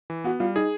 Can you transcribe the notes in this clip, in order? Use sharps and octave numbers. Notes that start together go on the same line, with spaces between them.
E3
B3 F#4
G3 F4
D#4 G#4